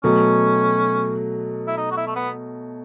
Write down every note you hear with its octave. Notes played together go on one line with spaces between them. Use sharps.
B2 F#3 A3 C#4
E4
D#4
F#4
E4
A3
B3